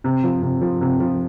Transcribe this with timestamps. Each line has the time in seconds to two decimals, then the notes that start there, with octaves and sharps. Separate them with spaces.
0.04 C3
0.24 F3
0.42 C3
0.61 F3
0.81 C3
1.00 F3